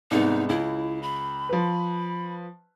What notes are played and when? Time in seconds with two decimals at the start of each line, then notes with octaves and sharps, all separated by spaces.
0.11 C2 G#2 B3 D#4
0.49 C#2 E4
1.02 B5
1.49 F3 B4